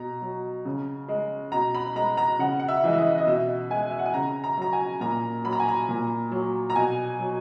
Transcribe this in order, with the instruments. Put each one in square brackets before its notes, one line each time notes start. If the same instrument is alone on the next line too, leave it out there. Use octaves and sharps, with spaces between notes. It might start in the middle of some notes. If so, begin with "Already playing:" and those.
Already playing: [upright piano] B2 A#5
F#3
C#3
G#3
B2 A#5
B5
G#3 A#5
A#5
C#3 F#5
F#5
E5
E3 G#3
E5
D#5
D#5
B2 E5
G#3 G#5
E5
F#5
G#5
C#3 A#5
A#5
F#3 A#5
G#5
A#2 A#5
F#3 B5
A#5
G#5
A#5
A#2
F#3
A#5
B2 G#5
F#3